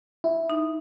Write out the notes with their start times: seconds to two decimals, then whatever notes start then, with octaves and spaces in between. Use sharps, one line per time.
0.24 E4
0.50 D#4